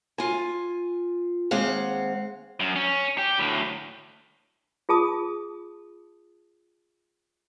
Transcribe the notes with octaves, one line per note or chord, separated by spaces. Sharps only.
F4 G#5
D#2 G#3 C4 C5 F5 F#5
F#2
C#4
G4
D2 A2
F4 G#4 A5 D#6